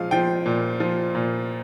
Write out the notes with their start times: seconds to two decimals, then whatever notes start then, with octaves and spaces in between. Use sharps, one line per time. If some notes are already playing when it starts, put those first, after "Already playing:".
Already playing: A#2 F3 G#3 F5
0.11 F3 G5
0.46 A#2
0.80 F3
1.15 A#2